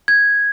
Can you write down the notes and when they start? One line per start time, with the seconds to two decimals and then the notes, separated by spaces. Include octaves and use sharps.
0.08 G#6